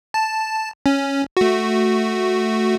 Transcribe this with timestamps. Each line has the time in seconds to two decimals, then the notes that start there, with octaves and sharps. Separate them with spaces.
0.14 A5
0.86 C#4
1.37 A3 F#4